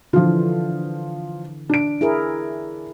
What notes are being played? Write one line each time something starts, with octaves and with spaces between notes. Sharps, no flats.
D3 E3 F3 F4
D4 D7
E4 G#4 A#4